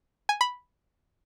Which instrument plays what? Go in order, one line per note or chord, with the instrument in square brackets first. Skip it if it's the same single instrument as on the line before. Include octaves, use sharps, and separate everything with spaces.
[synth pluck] G#5
B5